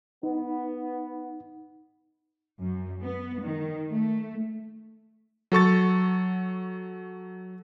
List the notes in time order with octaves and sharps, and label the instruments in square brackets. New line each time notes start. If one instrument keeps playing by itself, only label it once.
[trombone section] B3 [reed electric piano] D#4
[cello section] F#2
B3
D#3
A3
[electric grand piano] F#3 A4 C#6 A6